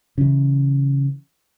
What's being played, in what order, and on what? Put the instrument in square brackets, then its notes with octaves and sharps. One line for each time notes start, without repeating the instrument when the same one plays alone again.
[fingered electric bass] C#3 E3